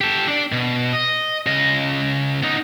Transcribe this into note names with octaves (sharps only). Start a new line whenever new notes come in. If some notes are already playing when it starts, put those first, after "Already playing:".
G4 A4
D4 D5
B2
D#5
C#3 D#5
B3 D#4